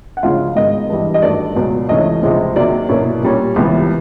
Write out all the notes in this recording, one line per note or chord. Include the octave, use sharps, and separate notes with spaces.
F#5
D2 C#3 F3 G#3 C#4 F4 F5
G#2 D#3 G#3 B3 D#5
G2 E3 G3
D#5
G2 D#3 F#3 A3 D5
C#2 B2 F#3 B3
C#2 C3 E3 A3 C#4 D#5
C#2 C3 F3 G#3 C4
C3 D#3 F#3 A#3 D5
B2 F#3 A#3 C#4 E4
A#2 G3 A#3 C#4
C#2 C3 E3 G3 B3